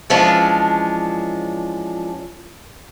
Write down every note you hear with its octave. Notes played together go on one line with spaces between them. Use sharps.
E3 F3 G#3 C#4 D4